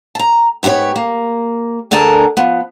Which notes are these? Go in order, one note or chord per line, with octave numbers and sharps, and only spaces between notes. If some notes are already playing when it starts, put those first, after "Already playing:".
A5 A#5
G#2 B3 F#4 G4 C#5
A#3
D2 D3 G#4 A#4 A5
F3 B3